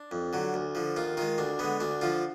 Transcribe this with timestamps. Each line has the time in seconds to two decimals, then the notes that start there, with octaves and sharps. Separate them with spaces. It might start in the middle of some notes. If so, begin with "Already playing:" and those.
Already playing: D4
0.11 F2
0.33 D3 F#3
0.54 D2
0.75 D3 F3
0.96 D#2 F4
1.17 D#3 G#3 F4
1.38 D2 D4
1.59 D3 G#3 B3
1.80 D2 D4
2.01 D3 F3 F4